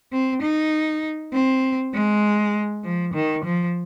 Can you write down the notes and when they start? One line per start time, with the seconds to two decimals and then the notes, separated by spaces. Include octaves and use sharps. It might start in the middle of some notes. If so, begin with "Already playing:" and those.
0.12 C4
0.42 D#4
1.33 C4
1.93 G#3
2.84 F3
3.14 D#3
3.44 F3